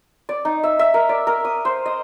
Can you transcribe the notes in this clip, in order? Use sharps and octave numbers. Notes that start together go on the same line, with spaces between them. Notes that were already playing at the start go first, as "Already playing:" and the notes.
D5
D#4
E5
E5
A#4
D5
A#4
D#6
C5
D#5